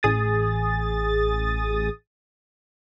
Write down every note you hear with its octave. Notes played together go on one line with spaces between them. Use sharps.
A1 G#4 D#6 A6